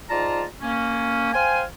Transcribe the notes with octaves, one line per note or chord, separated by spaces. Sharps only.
G#2 F4 D5 A5 A#5
A#3 C#4
C5 F5 G5 G#5